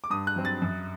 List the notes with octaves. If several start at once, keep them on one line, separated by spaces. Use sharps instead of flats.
D6
G2 D#6
F#6
F#3 C4
A6
F#2